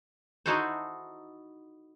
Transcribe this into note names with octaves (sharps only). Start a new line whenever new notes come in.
D#4 E4 F#4 A4 C5